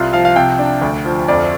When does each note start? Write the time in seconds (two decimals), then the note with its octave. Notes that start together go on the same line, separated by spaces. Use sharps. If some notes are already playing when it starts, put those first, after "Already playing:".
Already playing: C2 F4
0.13 F3 F5
0.25 F5
0.36 C3 G5
0.59 D4
0.82 D2
1.05 F3
1.28 F2 D5